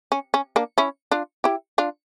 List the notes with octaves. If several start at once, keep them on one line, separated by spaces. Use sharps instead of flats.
C#4
C#4
A#3 D4
C#4 E4
D4 F4
E4 G4
D4 F4